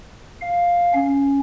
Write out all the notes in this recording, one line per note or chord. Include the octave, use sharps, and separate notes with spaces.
F5
C#4